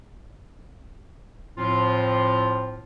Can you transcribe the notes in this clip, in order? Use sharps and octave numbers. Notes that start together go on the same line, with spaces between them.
A2 F3 C4 F4